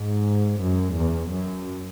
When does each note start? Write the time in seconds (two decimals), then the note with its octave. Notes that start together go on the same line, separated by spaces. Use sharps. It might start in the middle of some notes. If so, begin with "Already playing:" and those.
Already playing: G#2
0.61 F#2
0.96 E2
1.31 F#2